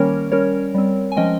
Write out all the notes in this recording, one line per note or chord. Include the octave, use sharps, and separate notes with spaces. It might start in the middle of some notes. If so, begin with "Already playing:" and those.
Already playing: D#3 G3 A#3 C#4 A#4 C#5
G3 C#4 A#4 C#5
G3 C4
G#5
F3 G#3 C#4 D#5 G5